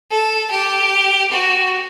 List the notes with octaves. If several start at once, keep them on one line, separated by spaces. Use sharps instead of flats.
A4
G4
F#4